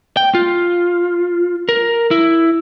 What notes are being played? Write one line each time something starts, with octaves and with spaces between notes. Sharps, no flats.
G5
F4
A#4
E4